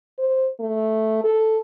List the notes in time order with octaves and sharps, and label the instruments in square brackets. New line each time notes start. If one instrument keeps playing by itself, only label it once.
[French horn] C5
A3
A4